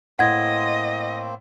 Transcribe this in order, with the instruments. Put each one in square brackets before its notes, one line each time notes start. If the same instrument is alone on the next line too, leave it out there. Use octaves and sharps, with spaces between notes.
[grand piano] A2 [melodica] A#3 C4 C5 [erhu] D#5 [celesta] F#5 G#6